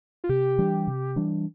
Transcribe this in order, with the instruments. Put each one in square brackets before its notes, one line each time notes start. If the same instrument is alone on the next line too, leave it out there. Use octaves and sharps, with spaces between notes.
[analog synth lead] F4
[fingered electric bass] C3 [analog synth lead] G4
[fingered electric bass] E3 G3 D4
C3
E3 G3 D4